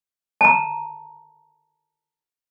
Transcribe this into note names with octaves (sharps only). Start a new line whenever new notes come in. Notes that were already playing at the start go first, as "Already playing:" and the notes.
A5 A#5